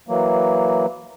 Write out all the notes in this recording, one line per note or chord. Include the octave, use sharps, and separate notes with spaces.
E3 F#3 A#3